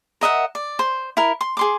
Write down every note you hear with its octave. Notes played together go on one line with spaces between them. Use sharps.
A#4 D#5 E5 F#5
D5
C5
E4 A#4
C6
G#4 C6 D6